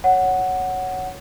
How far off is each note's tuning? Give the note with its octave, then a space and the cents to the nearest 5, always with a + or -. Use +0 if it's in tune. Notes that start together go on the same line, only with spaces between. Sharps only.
C#5 +0 F#5 +0